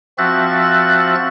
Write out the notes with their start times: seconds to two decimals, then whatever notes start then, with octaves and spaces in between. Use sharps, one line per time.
0.18 F3 C4 F#4 E5 F#6 A6